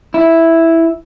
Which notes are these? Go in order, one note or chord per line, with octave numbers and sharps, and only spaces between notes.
E4